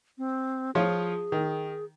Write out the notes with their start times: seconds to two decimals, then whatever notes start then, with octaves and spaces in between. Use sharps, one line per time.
0.18 C4
0.75 F3 F4 G#4 C#5
1.32 D#3